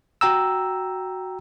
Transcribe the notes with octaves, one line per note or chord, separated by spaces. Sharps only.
F#4 G5 A#5 E6